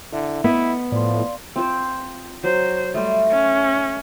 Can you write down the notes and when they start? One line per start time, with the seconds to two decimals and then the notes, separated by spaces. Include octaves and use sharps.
0.13 D3 E4 E5
0.44 B3 E4 D#5
0.92 A2 F3 D5 F5 C6
1.56 C4 F4 C5
2.44 F#3 C5
2.94 G3 A3 C6
3.30 C#4